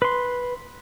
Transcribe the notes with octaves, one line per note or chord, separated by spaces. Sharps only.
B4 C6